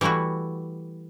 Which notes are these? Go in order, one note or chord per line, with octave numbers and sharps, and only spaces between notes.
E3 G3 A3 E4 F#4